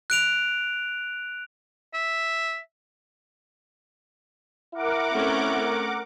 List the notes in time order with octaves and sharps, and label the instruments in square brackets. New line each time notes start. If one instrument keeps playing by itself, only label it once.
[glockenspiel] F#6 D7 F7
[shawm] E5
[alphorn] E4 [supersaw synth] A#4 F#5 D6
[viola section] A3 C4 C#4